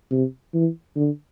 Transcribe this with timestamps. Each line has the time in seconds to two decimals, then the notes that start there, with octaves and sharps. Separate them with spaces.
0.11 C3
0.54 E3
0.96 D3